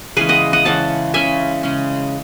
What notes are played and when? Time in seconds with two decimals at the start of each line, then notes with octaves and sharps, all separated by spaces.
0.17 C#3 E3 G#3 C#4 G#4 B4
0.29 D#5 F#5
0.53 D#5 F#5
0.65 C#3 E3 G#3 C#4 F#5 A5
1.14 C#3 G#3 C#4 E5 G#5
1.63 C#3 G#3 C#4